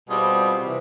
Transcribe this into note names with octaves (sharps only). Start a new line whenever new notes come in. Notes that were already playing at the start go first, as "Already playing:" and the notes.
B2 G3 C4 F4 G#4
C3 E3